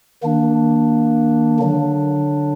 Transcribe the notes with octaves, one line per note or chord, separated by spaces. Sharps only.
D#3 A#3 D4
D3 F#3 D4